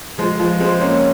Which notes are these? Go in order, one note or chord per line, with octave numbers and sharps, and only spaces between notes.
F3 G#3
F3 G#3
G#3 C4
A#3 C#4